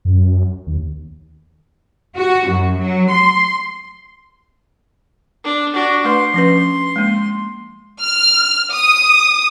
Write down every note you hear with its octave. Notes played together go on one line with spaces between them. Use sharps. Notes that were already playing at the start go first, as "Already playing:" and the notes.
F#2
D#2
F#4
F#2
F#3
C6
D4
D4 F#4
A3 B4 C6
F3 C#4 B4
G#3 A#3
F6
D#6